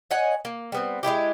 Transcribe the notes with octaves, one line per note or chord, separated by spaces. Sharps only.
C#5 D#5 F#5 G#5
A#3
G3 B3 C4
G#3 A3 E4 G4